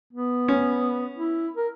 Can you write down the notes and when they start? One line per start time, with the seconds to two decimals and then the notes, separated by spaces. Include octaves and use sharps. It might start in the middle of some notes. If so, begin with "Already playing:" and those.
0.13 B3
0.48 C#4
1.16 E4
1.57 A#4